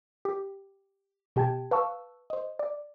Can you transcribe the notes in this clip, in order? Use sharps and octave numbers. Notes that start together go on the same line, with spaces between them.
G4
B2 G4 G5 A5 G#6
B4 F5 A5 C#6 E6
C5 D#5
D5